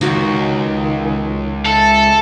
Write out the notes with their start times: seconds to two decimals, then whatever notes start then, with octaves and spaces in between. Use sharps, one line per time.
0.01 C#2 D#3 D#4 F#4 F#5
1.66 A4 E5